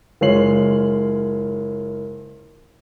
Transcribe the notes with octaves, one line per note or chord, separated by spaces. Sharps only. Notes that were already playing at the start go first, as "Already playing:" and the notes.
F#1 G#3 F4 C#5 C7 F#7